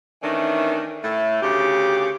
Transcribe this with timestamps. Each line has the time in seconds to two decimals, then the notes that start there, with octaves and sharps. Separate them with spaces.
0.23 D#3 E3 A3 C#4 D4
1.03 A2 A3
1.42 D2 C#3 G4